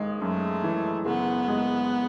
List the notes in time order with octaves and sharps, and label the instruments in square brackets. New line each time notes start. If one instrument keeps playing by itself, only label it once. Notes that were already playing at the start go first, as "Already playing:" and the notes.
Already playing: [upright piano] G#1 G#3
[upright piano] F#2 [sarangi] A3
[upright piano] E3
[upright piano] F#1 [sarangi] B3
[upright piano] G#3